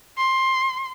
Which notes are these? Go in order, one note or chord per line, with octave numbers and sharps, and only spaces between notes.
C6